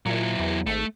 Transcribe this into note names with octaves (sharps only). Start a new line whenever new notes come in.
A#2 F#3 E4
E2
G#1 A3